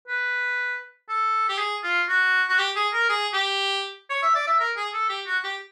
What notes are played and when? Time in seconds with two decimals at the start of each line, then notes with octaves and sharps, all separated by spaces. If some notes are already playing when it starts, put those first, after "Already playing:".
0.08 B4
1.09 A4
1.49 G4
1.58 G#4
1.83 F4
2.09 F#4
2.49 F#4
2.59 G4
2.76 G#4
2.93 A#4
3.09 G#4
3.34 G4
4.10 C#5
4.23 E5
4.35 D5
4.47 E5
4.59 A#4
4.77 G#4
4.93 A4
5.09 G4
5.27 F#4
5.44 G4